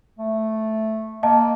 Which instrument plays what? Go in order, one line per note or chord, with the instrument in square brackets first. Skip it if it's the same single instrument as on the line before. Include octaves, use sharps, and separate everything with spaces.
[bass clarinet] A3
[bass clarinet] A#3 [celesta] D#5 F5 A5